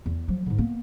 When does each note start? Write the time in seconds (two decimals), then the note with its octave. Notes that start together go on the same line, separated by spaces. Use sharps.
0.06 E2
0.28 F3 F#3
0.46 G#2 D3
0.58 A#3 B3